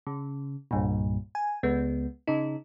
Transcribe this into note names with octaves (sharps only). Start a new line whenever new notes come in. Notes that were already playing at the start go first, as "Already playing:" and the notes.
C#3
C2 G2 A#2
G#5
C#2 G#3 B3
C#3 D#4